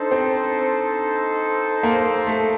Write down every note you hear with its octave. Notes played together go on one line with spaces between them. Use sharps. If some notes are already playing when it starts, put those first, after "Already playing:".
Already playing: D4 D#4 A4 C5
C4
A#3
A3